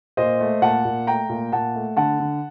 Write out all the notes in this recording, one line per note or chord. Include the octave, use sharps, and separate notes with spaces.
A#2 C5 D#5
A3
A#2 F#5 A5
A#2
A3 G5 A#5
A#2
A#2 F#5 A5
A3
D3 F#5 A5
D3